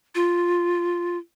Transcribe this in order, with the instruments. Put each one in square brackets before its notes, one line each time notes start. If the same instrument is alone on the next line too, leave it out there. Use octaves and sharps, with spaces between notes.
[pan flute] F4